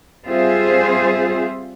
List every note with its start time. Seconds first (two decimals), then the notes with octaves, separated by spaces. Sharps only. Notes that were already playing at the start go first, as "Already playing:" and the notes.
0.24 G3 C4 F4 G#4 C5 E5